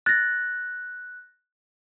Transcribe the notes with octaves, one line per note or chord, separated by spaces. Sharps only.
F#6 A6 A#6